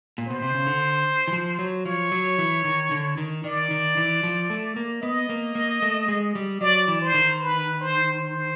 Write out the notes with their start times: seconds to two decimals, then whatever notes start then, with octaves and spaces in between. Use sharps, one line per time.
0.18 A#2
0.27 B2 C5
0.42 C3
0.55 C#3
0.67 D3
1.28 E3
1.33 F3
1.59 F#3
1.85 F3 C#5
2.12 F#3
2.38 E3
2.65 D#3
2.91 D3
3.17 D#3
3.44 D#3 D5
3.71 D#3
3.97 E3
4.23 F3
4.50 A3
4.76 A#3
5.03 B3 D#5
5.29 A#3
5.55 A#3
5.82 A3
6.08 G#3
6.35 G3
6.61 F#3 D5
6.88 E3
7.01 C5
7.14 D#3
7.41 B4
7.81 C5
8.20 C5